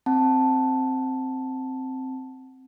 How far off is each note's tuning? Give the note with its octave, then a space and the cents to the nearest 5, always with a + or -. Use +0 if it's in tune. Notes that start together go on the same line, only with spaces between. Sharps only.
C4 +0 F#5 +0 A5 +0